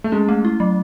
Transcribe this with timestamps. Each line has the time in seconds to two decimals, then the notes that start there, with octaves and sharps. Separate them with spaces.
0.04 A3
0.12 G#3 C#4
0.29 A3
0.45 E4
0.60 F#3